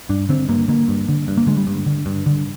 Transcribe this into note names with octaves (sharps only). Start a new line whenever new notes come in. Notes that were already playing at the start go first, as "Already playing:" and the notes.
G2 D4
D3 C4
G2 A#3
D3 A#3
G2
D3
G2
A#3
D3 G#3
G3
G2
D3
G2
D3